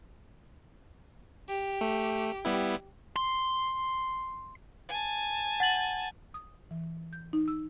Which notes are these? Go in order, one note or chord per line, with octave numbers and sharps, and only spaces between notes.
G4
A3
G3 B3 E4
C6
G#5 A5
F#5 A6 F#7
D#6
E3
G6
D#4
E6